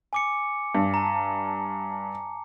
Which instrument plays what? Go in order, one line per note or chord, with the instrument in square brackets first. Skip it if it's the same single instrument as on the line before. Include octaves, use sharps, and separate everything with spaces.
[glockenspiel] G#5 D6 C#7
[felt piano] G2
[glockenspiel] A5 A#5